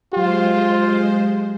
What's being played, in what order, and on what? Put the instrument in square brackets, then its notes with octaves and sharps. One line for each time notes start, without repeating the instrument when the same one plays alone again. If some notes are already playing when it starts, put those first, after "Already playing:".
[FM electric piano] F#3 G4 [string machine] G#3 C5 [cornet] F4